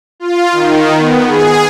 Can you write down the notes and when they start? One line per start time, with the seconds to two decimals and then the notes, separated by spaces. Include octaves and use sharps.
0.20 F4
0.52 D#3
0.97 B3
1.26 G#4